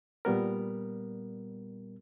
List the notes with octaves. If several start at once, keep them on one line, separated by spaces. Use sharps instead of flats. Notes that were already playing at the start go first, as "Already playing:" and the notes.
A#2 G3 B3 A#4